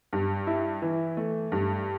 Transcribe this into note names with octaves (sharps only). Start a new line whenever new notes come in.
G2
E4
E3
A3
G2